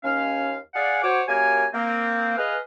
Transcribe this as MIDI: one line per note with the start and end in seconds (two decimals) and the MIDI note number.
0.03 0.57 39
0.03 0.57 61
0.03 0.57 77
0.74 1.01 68
0.74 1.01 74
0.74 1.01 77
0.74 1.01 78
1.03 1.22 66
1.03 1.22 72
1.03 1.22 73
1.03 1.22 86
1.28 1.66 42
1.28 1.66 58
1.28 1.66 67
1.28 1.66 73
1.28 1.66 80
1.74 2.35 58
1.74 2.35 60
2.38 2.58 68
2.38 2.58 71
2.38 2.58 75
2.38 2.58 77